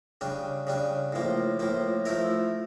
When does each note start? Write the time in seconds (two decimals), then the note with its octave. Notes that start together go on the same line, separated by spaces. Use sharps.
0.21 C#3 G3 D4
0.67 C#3 G3 D4
1.13 A2 F3 A#3
1.59 A2 F3 A#3
2.05 F3 A3 E4 A#4